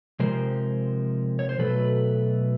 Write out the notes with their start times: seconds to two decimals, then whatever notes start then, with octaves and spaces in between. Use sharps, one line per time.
0.20 C3 F3 G#3 A#4 C5
1.39 C#5
1.49 C5
1.59 B2 F#3 A3 A4 B4